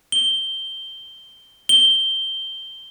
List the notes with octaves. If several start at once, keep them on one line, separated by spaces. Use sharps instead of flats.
G7
G7